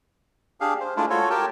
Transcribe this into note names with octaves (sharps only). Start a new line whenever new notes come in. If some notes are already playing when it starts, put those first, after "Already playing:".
D4 G4 G#4 F5
C5
G#3 A3 D4 E4 F4
F4 F#4 A4 C#5
G4 A#4 G5 A5